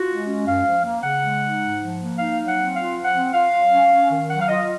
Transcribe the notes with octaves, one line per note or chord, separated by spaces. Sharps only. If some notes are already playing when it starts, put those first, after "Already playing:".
Already playing: F4 F#4
G#3
C#4
F#2 F5
F3
A#3
C#3 F#5
G#3
D#4
G#2
F3
A#3
D#4 F5
F#3
F#5
C4
F4 F5
F3
F#5
C4
F4 F5
F#3
C#4
C#4
D#3
F#3 F#5
F5
F4 D#5